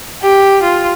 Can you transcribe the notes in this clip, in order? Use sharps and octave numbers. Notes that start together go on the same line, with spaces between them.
G4
F4